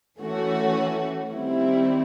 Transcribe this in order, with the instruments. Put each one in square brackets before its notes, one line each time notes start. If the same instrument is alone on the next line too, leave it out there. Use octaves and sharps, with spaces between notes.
[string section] E3 A3 C#4 F#4
D#3 G3 C4 E4